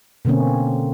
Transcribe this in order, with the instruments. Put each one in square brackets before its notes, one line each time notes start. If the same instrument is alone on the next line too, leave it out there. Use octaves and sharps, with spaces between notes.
[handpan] B2 D3 A#3 C4 C#4